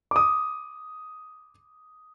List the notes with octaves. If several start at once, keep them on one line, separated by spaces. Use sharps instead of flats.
D6 D#6